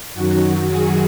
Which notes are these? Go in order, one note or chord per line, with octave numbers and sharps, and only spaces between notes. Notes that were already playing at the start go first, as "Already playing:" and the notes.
F#2 D#3 F#3 F#4
G#4